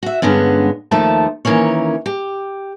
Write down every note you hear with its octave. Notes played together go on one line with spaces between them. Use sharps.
F#4 E5
G2 D3 G#3 B3 C#4
D#2 D#3 F3 A3 A5
D#3 E3 A#3 C#4 C#5
G4